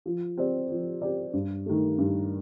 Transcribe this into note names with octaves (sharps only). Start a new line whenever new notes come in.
F3
C4 G4 D5
F3
C4 G4 D5
G2
D#3 A3
G2